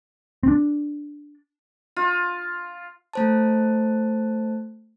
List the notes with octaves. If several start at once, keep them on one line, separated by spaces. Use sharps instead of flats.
C4 D4
F4
A3 C5 A5